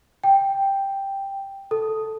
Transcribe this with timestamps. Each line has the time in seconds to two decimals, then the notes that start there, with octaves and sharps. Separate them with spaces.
0.24 G5
1.71 A4